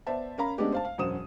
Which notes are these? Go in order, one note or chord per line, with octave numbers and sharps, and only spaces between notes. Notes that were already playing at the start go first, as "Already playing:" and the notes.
B3 C5 D5 E5 A5
C#4 A#4 F5 A#5 B5
G#3 A3 B3 C#4 D4 G4
C5 F5 A5
F5
E1 F#2 F#4 C5 D#6 E7